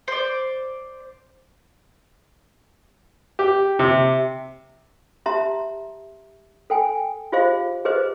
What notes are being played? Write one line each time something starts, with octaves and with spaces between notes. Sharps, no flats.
C5 D5
G4
C3
G4 E5 A5 A#5 C6
A4 G5 G#5
F4 G4 G#4 C5 D#5 F5
G4 G#4 B4 C5 D#5